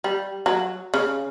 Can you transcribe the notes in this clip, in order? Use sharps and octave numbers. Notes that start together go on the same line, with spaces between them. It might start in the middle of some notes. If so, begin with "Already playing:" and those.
G3
F#3
C#3